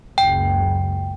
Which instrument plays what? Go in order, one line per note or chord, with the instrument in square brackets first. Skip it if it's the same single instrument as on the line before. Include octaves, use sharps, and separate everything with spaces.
[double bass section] F#1 C#2 F#2 [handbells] G5